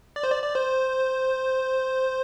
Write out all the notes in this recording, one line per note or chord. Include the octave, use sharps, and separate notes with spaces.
D5
C5
D5
D5
C5